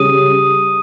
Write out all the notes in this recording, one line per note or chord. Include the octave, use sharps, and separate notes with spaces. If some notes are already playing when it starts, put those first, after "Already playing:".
Already playing: C#3 G3 C#4 G#4 C#5 D#6 D#7